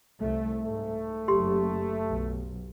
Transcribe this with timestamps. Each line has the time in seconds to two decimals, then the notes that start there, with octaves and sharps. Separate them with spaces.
0.20 C2 A3
0.63 G#2 A3
1.28 F#1 G4 C6
2.08 B1